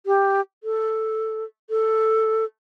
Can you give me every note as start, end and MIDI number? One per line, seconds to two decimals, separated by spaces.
0.06 0.41 67
0.64 1.44 69
1.70 2.45 69